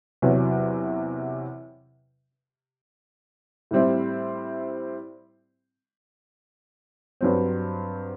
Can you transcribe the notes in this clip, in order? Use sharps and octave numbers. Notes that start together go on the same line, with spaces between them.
E2 C3 F#3
A2 G3 C4 E4
G2 F#3 C4